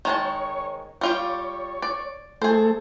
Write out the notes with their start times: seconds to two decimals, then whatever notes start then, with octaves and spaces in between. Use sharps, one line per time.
0.05 D#3 G#3 C#5 A5
1.01 G3 F4 G4 C#5
1.82 D5
2.42 A3 G#4 A4 C5